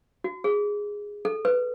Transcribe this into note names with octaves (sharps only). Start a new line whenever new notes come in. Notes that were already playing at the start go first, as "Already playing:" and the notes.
F#4
G#4
A4
B4